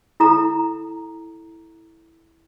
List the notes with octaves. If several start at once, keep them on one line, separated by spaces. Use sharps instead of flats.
E4 A4 A#5